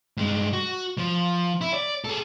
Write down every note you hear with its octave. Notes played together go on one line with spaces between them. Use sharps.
G2 G#3
F#4
F3
E4
D5
G#4 A4